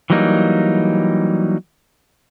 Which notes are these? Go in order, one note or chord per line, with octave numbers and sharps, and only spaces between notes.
E3 F#3 G3 A#3 D#4